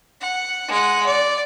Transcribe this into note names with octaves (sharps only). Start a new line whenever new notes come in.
F#5
G#3 F#5
D5